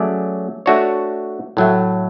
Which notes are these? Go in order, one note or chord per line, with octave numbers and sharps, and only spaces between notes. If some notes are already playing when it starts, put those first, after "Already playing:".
Already playing: F#3 A3 C#4 G#4 D5
A3 D4 F#4 C#5
A2 F#3 A3